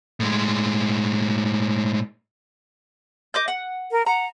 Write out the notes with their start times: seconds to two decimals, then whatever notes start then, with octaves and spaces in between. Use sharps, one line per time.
0.20 A2 G#3
3.34 D#5 D6 G6
3.48 F#5
3.91 A#4
4.06 F#5 A#5